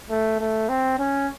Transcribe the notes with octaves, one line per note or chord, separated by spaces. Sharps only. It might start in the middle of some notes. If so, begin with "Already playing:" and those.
A3
A3
C4
C#4